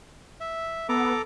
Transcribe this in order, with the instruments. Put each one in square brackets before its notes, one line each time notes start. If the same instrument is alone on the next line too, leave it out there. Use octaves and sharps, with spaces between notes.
[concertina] E5
[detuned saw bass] B3 [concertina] A4 A#5 D6